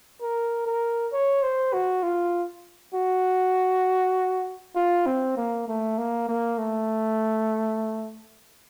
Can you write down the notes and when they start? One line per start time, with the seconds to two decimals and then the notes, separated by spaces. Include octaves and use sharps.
0.22 A#4
0.66 A#4
1.13 C#5
1.42 C5
1.73 F#4
2.03 F4
2.94 F#4
4.76 F4
5.06 C4
5.37 A#3
5.68 A3
5.98 A#3
6.29 A#3
6.58 A3